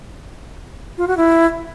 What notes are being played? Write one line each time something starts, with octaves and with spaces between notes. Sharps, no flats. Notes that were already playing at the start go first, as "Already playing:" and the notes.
F4
F#4
E4